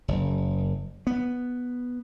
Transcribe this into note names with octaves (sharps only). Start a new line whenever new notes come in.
F#1
B3